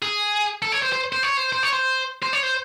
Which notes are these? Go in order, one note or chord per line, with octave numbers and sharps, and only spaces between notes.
G#4
A4
C#5
C5
C5
C5
C#5
C5
C5
C#5
C5
C5
C#5
C5